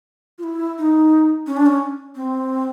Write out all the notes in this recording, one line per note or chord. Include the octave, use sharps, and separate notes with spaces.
F4
E4
D#4
C#4
D4
C#4
C4